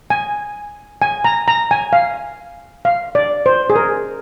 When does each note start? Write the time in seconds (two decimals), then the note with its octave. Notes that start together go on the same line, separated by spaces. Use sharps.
0.10 G#5
1.02 G#5
1.24 A#5
1.48 A#5
1.71 G#5
1.93 F5
2.85 F5
3.15 D5
3.46 C5
3.70 G#4
3.76 A#4